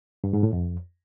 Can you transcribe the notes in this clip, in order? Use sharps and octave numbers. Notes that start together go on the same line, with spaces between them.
G2
G#2
A2
F2